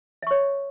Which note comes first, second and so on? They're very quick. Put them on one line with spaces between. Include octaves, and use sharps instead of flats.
E5 C#6 C#5